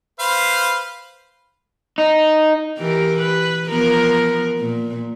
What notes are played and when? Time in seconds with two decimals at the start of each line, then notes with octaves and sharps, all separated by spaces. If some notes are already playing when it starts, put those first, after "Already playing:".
0.20 B4 C5 F5
1.98 D#4
2.78 E3 G4 A#4
3.19 B4
3.67 F3 B3 A#4
4.60 A#2